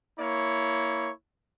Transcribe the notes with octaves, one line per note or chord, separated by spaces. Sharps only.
A#3 E4 C#5